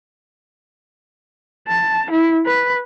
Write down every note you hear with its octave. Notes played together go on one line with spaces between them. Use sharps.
A5
E4
B4